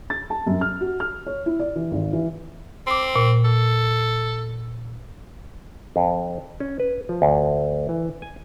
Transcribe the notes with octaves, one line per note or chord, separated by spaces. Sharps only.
A6
A5
F#2
F6
F#4
F6
C#5
E4
D5
E3
G#1
E3
C4 C6 D6
A#2
A4
F2
C#4
B4
F3
D2
E3
G#5